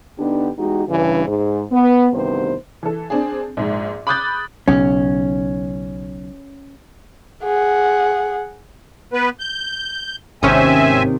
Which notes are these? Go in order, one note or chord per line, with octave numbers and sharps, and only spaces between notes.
D3 B3 D4 D#4 G4
E2 G#3 D#4 F#4 G4
G2 C#3 E3
G#2
B3
D2 G2 C3 D#3 B3 C5
E3 A4
C4 D4 G#4
A#1 G#2
B5 D6 D#6 F#6 G6 A6
B1 C#3 C#4
G#4 F#5
B3 B4
G6
G#1 D#2 C3 D#3 C4 C#4 E5 G#5